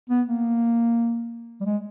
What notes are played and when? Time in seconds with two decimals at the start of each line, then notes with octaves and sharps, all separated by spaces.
0.09 B3
0.27 A#3
1.60 G3
1.65 G#3